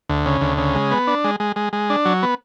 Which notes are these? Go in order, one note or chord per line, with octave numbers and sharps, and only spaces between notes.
D2
C#3
D2
C#3
G#3
B3
D4
G#3
G#3
G#3
G#3
D4
F#3
B3